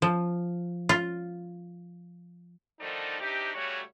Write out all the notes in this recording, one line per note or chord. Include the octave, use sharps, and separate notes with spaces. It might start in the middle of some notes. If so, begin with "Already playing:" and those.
F3
F4
D3 D#3 F3 A3 D4 D#4
C3 D4 D#4 G4
C#3 G3 A3 F#4 C#5